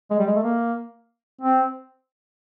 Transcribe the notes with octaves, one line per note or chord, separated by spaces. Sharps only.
G#3
G3
G#3
A3
A#3
C4